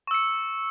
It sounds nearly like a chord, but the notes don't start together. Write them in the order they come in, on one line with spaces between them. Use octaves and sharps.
C#6 E6 C#7